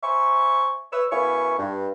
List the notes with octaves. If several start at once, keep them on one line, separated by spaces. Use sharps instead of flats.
C5 E5 G#5 B5 C#6
B4 C#5 E6
F#2 B3 E4 F5 G#5 C#6
G2